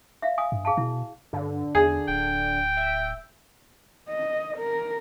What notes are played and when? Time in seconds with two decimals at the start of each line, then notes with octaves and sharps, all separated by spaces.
0.22 E5 F5
0.38 F5 G#5 D#6
0.52 G2
0.65 G#4 F5 A5
0.77 B2 E4
1.33 G2 D3
1.75 E2 G#4
2.08 D1 G5
2.77 E5
4.09 D#5
4.57 A#4